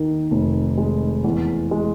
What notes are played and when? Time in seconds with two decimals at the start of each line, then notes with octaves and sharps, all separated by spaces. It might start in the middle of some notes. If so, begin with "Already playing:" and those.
Already playing: D#2 D#3
0.31 F1
0.77 G#3
1.24 E2
1.71 G#3